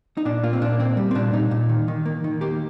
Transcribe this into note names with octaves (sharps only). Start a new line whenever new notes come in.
D#4
A#2 D4
A#3 F4
C4
A#2 D4
A#3 C4
G3
C4
A#2 D4
A#2 D#4
A#2
D#3
D#3
A#3
D#3
A#3 G4